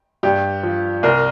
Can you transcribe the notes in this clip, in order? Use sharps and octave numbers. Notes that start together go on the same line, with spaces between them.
G2 G4
F3
C2 A#4